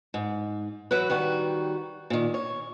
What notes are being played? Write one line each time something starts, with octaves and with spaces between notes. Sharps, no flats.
G#2
E3 F#3 F#4 B4
D#3 G3 F#4
A#2 D#3
C#5